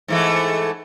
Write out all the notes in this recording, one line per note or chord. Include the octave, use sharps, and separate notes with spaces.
G#2 E3 A3